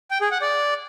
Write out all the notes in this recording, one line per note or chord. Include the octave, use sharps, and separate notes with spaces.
G5
G#4
F#5
D5